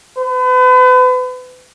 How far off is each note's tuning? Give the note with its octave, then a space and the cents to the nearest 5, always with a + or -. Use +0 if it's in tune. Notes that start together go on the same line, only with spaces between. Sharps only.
B4 +40